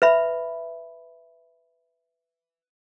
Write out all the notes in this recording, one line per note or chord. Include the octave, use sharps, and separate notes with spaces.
B4 E5 B5